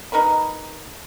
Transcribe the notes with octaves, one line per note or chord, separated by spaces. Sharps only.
D#4 A#4 B4 B5